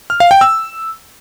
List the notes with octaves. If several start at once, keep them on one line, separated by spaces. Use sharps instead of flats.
F6
F5
G5
E6